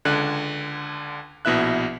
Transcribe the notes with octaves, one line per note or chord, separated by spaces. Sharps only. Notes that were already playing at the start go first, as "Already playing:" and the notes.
C#2 D3 F#6
A#1 B2 E4 E5 F#6